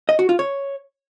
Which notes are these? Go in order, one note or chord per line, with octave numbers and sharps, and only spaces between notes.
D#5
F#4
F4
C#5